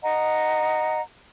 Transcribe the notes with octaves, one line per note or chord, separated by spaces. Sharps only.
D#5 F#5 A#5